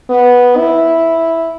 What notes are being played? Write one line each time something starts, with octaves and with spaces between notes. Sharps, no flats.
B3
E4